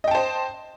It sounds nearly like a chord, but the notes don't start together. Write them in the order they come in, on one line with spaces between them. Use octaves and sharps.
D#5 G5 A5 C5